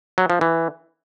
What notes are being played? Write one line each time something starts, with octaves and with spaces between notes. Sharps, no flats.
F#3
F3
E3